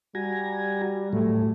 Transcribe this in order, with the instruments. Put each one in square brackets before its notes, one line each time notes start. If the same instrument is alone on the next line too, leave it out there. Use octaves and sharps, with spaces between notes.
[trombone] G3 [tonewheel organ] F#4 G#5 A#5
[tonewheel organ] A2 F#3 [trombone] A3